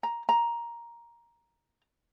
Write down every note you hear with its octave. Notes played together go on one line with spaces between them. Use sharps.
A#5
A#5